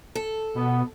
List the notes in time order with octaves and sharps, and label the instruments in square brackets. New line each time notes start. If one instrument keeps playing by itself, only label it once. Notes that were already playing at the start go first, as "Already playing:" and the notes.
[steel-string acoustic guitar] A4
[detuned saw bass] B2 [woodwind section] B3